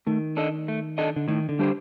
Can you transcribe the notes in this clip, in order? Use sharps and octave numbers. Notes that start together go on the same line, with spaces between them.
D#3 A3
D4 A4 D#5
A3
D4 A4 D#5
D3
A2 D#3
D3
G3 D4 G4 C5